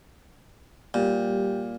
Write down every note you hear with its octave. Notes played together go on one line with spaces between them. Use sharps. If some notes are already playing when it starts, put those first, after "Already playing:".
A#2 G3 G4